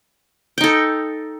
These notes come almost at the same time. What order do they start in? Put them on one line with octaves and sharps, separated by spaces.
G5 D#4 A4